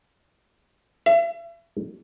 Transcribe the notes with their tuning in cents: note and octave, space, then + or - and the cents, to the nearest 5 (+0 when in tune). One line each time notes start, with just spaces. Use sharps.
E5 +40